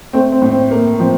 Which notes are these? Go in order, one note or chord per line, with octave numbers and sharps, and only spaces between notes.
A3 C4
C4
A2
C4
A3 A#3
F3 C4